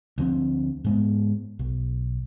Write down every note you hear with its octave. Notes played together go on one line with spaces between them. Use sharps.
D2 F3 C4
G#2 G#3 B3
B1